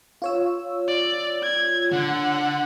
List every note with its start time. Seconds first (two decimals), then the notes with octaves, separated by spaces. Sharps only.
0.22 F4 C#5 E6
0.88 D5
1.43 G#6
1.92 D3 F#5